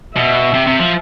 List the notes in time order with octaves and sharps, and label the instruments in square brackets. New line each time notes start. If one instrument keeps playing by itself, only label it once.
[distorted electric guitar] B2 [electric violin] E5
[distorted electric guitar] C3
C3
F3